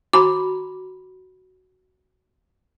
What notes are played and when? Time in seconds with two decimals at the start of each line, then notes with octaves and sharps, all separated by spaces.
0.13 F#4 A#5 B5 D6